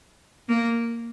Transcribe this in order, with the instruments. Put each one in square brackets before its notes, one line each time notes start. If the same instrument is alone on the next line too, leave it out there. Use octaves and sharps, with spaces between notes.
[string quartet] A#3